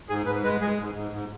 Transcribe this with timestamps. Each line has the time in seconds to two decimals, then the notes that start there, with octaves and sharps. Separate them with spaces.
0.09 G#2 G#4
0.26 G#2 B4
0.44 G#3 B4
0.61 G#3 G#4
0.78 G#2
0.95 G#2
1.11 G#2